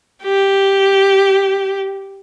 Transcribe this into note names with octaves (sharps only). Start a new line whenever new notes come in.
G4